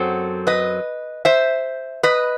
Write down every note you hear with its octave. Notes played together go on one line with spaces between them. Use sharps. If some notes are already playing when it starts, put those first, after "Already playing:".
Already playing: F#2 F#3 C4 A4 C5
B4 D#5
C5 E5
B4 D#5